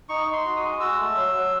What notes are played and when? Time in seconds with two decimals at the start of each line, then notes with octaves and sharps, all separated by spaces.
0.09 D#4 C#6
0.27 D#4
0.33 C6
0.45 F#4
0.56 D#6
0.62 G#3
0.80 F#4 E6
0.98 A3
1.16 F#3
1.34 F#3